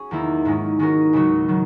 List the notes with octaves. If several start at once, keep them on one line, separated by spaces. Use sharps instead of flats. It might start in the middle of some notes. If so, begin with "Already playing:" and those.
Already playing: C#4 F#4 G#4
E2 D#3 A#3 E4
G#2 D#3 G#3 C#4
D#3 G#3 C#4 F#4 A#4
C#2 C#3 F#3 C#4 F#4
D#3 F#3